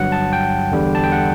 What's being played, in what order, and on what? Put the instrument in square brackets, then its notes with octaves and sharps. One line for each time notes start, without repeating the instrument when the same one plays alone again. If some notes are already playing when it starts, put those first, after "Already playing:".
Already playing: [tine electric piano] G1 G2 F#3 F#5
A5
G5
E2 D3 G3
A5
G5
F#5